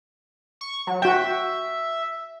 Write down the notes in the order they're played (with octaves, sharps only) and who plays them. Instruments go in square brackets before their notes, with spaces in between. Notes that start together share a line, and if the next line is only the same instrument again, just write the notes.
[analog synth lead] C#6
F#3
[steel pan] F#4 G5 [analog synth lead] E5